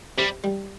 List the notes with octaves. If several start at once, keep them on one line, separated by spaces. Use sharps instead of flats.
C3 G3
G3